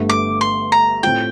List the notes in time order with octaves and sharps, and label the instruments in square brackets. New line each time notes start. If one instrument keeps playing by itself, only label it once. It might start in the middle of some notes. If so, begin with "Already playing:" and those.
Already playing: [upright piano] G1 G2 D3 A3
[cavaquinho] D6
C6
A#5
[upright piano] A2 A3 C4 F4 [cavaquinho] G5